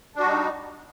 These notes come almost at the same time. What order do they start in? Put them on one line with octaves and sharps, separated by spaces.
D4 F#4 G3 D#4